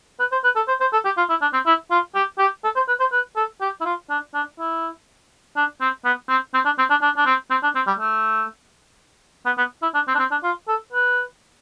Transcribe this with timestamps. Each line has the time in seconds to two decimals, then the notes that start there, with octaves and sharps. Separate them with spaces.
0.20 B4
0.32 C5
0.44 B4
0.56 A4
0.68 C5
0.80 C5
0.93 A4
1.05 G4
1.17 F4
1.30 E4
1.42 D4
1.53 C4
1.66 E4
1.91 F4
2.15 G4
2.39 G4
2.64 A4
2.75 C5
2.88 B4
3.00 C5
3.12 B4
3.37 A4
3.61 G4
3.81 E4
3.85 F4
4.10 D4
4.34 D4
4.59 E4
5.57 D4
5.81 C4
6.05 B3
6.29 C4
6.54 C4
6.66 D4
6.78 C4
6.90 D4
7.02 D4
7.17 D4
7.26 C4
7.51 C4
7.63 D4
7.75 C4
7.87 G3
7.99 A3
9.46 B3
9.58 B3
9.83 E4
9.95 D4
10.08 C4
10.15 D4
10.19 C4
10.31 D4
10.43 F4
10.68 A4
10.92 B4